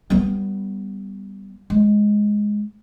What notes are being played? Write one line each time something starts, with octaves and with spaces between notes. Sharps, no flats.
G3 B3
G#3